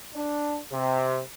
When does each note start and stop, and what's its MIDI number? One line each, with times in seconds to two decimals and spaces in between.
0.14 0.59 62
0.73 1.20 48